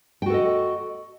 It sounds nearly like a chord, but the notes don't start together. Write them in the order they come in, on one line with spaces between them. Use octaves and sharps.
G5 F#4 A4 D#5